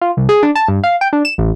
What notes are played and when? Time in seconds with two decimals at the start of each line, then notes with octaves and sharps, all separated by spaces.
0.01 F4
0.17 C2
0.29 G#4
0.43 D4
0.55 A5
0.68 G2
0.84 F5
1.01 G5
1.13 D4
1.25 E7
1.38 A1